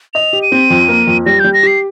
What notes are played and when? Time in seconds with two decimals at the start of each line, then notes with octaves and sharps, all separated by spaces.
0.14 D#5 F7
0.33 G4
0.42 D#7
0.52 C4
0.70 F2
0.89 A#3
1.07 F2
1.26 G3 A#6
1.40 G3 G6
1.54 A#6
1.63 G4 C7